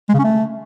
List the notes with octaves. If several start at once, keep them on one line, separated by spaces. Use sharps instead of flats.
G#3
C#3
C#4
A3